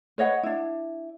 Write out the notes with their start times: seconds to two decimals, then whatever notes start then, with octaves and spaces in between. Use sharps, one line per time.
0.18 B4 C#5 D#5 F#5
0.43 D4 E4